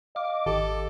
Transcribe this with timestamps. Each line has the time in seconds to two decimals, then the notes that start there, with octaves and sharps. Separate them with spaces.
0.16 D#5 F5 D6
0.46 G#1 D#3 G4 A4